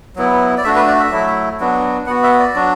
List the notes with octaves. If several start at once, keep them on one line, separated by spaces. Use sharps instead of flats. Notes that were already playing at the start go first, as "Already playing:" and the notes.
F#3 B3 E4
D5
A3 D4 F#4 E5
B4
D5
E5
F#3 A3 E4
F#3 B3 D4 F#4
B3 F#4 F#5
E5
D5
F#3 D4 F#4